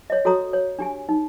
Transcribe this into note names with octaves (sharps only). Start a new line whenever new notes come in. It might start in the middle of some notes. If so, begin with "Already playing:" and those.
C#5 D#5
F#4 A4 C#5 A#5 D#6
C#5
D4 G4 G#5
D#4